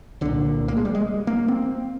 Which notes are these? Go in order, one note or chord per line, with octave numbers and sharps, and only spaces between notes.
C2 A#2 D3
A#3
G#3
G3
G#3
A#3
C4